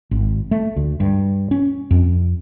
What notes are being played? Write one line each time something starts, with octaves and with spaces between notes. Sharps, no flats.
G#1
A3
D2
G2
C#4
F2